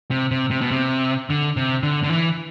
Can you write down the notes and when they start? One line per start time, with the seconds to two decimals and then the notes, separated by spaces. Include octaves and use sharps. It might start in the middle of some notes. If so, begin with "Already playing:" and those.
0.11 C3
0.31 C3
0.51 C3
0.61 B2
0.71 C3
1.30 D3
1.57 C3
1.83 D3
2.03 D3
2.10 E3